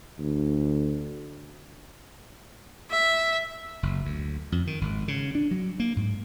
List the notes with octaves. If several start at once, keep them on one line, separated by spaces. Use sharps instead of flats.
D2
E5
F#1
D2
F2
D#3
G#1
C#3
D4
F#3
A#3
G#2